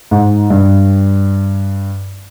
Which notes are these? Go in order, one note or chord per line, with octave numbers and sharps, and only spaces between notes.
G#2
G2